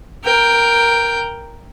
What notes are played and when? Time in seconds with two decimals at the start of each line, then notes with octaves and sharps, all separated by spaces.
0.24 A#4 G5